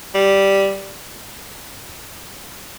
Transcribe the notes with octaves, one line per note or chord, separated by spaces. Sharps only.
G3